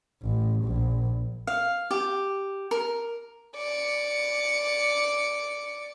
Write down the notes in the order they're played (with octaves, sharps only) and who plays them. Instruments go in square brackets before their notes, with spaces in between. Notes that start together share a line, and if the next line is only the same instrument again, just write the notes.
[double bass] A1
A#1
[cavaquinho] F5
G4
A#4
[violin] D5 C#7